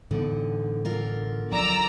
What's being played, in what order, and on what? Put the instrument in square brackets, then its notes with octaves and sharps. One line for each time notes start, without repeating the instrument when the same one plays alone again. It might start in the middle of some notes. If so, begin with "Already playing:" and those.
[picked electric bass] A2 E3 B3 [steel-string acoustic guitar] D3 D#4
[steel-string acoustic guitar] D3 F4 A#4
[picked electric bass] F3 F#3 D4 [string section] D5 A#5 E6